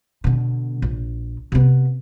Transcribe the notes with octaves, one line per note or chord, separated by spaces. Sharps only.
B2 D3
A#1
C3 B3